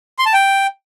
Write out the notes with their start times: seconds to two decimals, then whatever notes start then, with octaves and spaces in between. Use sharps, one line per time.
0.19 C6
0.26 A5
0.33 G5